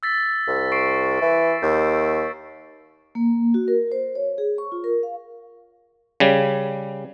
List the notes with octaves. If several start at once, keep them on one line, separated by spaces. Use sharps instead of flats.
E6 A6 B6
C2
C#6 C7 D7
E3
D#2 G6
A#3
F#4
A#4
C5
C#5
G#4
C#6
F4
A#4
F5
C#3 G3